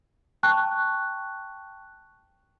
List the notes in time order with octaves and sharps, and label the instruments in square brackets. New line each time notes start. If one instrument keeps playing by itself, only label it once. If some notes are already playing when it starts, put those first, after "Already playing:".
[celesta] G5 A5 C#6 F#6